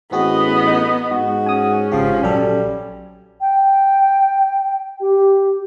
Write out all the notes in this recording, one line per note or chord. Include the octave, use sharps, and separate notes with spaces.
A1 B3 C4 F#4 G#4 D#5
D#4
G#2 F#4
C#4 G#5 D#6
G#1 C#3 F3 G4
A#1 F#3 G3 A4
G5
G4